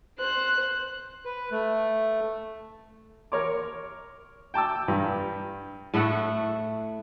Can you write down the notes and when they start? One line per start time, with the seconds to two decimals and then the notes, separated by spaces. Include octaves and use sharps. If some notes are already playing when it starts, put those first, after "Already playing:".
0.19 C5 F#6
1.25 B4
1.52 A3
3.32 A#4 C#5 D6
4.54 G5 A5 D6 E6
4.88 G2
5.94 A2 A3 E5 F#5